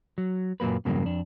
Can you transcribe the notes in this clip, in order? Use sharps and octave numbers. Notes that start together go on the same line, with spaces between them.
F#3
F#2 A#2 F#3 A#3 B4
E2 G2 C#3 F#3 A#3
F2 D4